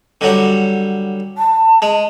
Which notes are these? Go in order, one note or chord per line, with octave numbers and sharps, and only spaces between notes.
D3 F#3 G3
A5
G#3